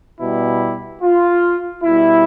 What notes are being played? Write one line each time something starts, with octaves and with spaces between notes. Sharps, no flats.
B2 G3 E4
F4
B2 G3 E4